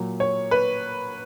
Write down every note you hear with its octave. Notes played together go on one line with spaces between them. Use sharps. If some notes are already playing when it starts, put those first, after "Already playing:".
Already playing: A#2 F#3
C#5
B4